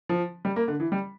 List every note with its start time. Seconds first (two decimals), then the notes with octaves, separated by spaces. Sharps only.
0.09 F3
0.45 G3
0.56 A#3
0.68 D3
0.80 E3
0.92 G3